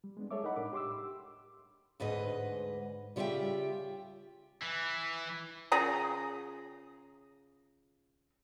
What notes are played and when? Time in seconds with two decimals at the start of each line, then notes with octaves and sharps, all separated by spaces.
0.04 G3
0.17 G#3 B3 D4
0.31 G#4 A4 C#5 E5 D6
0.44 D#4 A#4 D#5 F#5 B5
0.56 A2 D4 D6
0.73 G4 C6 D6 E6
2.00 D2 G#2 B4 D#5
3.16 C#3 G3 F4 C#5 E5 G5
4.62 E3
5.72 C#3 F4 G#4 A#5